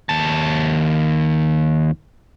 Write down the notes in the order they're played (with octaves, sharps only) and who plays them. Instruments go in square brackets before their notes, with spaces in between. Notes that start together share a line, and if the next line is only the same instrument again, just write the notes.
[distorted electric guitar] D#2 A5